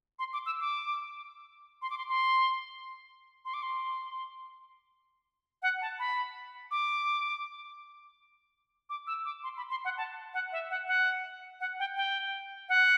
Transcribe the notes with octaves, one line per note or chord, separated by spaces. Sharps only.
C6
D6
E6
D6
C6
D6
C6
C6
C6
D6
C6
F#5
A5
B5
D6
D6
E6
D6
C6
B5
C6
F#5
A5
F#5
E5
F#5
F#5
F#5
G5
G5
F#5